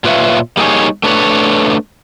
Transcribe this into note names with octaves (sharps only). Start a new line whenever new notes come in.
A#2 F4 B4 C#5 E5 F5
G3 A#3 D#4 G4 G#4 C#5
A3 D4 B4 C#5